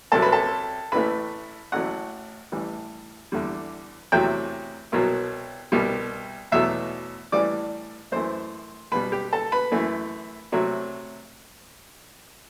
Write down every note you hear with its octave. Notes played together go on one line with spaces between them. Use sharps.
C2 C3 F#3 A4
B4
A4
A1 A2 E3 A3 B4
A1 A2 F#3 A3 F#5
A1 A2 E3 G3
E2 D3 G3
E2 C3 F#3 A3 G5
C2 B2 F#3
C2 B2 G3
E2 B2 F#3 A3 E5
A1 A2 E3 G3 D5
F#2 E3 A3 C5
B1 B2 G3 B4
G4
A4
B4
F#2 E3 A3
C3 F#3 A3